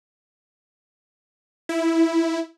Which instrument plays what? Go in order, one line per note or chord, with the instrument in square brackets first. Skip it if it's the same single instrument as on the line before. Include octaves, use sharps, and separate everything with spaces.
[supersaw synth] E4